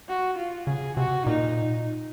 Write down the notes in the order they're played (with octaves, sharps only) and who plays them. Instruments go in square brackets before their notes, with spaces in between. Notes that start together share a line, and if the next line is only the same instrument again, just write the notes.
[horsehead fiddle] F#4
F4
[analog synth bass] C#3 [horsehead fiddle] G#4
[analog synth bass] C3 [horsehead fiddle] F#4
[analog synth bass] A#2 [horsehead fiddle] D#4